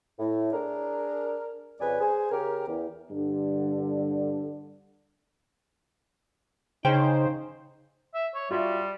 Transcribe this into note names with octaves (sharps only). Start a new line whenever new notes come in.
A2
D4 G#4 A#4
F2 C#3 B4 D5 G#5
G#4 C5 G#5
C#3 G4 A#4
E2
G2 D3
C#3 D#4 C5 G5
E5
C#5
G3 F4 F#4 E5